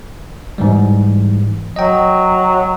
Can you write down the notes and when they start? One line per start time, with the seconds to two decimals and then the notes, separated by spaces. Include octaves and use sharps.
0.58 G#2 E3 G3
1.76 F#3 D#5 G5